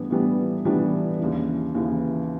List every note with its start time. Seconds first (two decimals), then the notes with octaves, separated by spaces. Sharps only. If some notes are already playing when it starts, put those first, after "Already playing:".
Already playing: A2 E3 G3 B3 D4
0.10 A2 E3 G3 B3 D4
0.65 A2 E3 G3 B3 D4
1.19 D#2 C#3 E3
1.75 D#2 C#3 E3